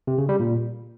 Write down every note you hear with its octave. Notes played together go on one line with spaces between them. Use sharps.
C3
C#3
G3
A#2